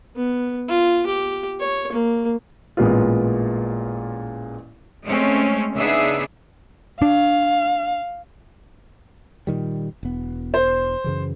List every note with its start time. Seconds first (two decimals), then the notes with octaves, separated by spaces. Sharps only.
0.16 B3
0.68 F4
1.06 G4
1.60 C#5
1.92 A#3
2.77 A1 A#2 G#3 B3 F4
5.06 G#3 A3 C4 C#4
5.74 C#3 B3 D4 D#4 G#4 E5
7.02 D4 F5
9.47 A#2 D#3 G3
10.03 E1 B3
10.54 C5
11.04 F#2 C#3 E3